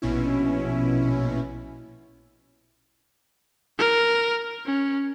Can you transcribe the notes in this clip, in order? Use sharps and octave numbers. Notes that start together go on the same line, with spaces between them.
A#1 B2 C#4 E4
A#4
C#4